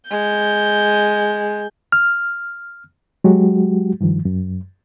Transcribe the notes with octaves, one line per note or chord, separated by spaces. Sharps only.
G#3 G6
F6
F#3 G#3 F#4 G4
G2 D#3 F3
F#2